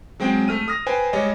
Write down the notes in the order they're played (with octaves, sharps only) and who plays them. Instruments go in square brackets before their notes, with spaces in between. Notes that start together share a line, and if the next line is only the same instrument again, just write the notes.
[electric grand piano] F#3 G#3 C4 G5
A3 F6 D#7
D#6 F6 A#6
B4 C5 G5 G#5
G3 G#3 C#5 D#5